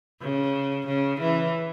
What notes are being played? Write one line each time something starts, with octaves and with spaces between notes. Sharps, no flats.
C#3
C#3
E3